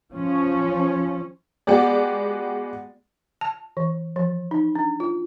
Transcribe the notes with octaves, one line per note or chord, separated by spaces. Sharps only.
F3 C#4
G#3 B3 F#4 G4 D5
A5
E3
F3
D#4
D4
F4